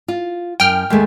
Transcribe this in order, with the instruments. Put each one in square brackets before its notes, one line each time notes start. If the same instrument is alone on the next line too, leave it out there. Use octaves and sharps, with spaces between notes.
[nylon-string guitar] F4
[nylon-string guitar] F#2 [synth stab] G5 F6
[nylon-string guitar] D#2 G#3 A3